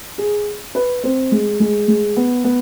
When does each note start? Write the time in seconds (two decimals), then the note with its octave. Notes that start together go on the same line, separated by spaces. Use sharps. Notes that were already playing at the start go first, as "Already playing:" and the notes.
0.18 G#4
0.75 B4
1.03 C4
1.32 G#3
1.60 G#3
1.88 G#3
2.17 B3
2.44 B3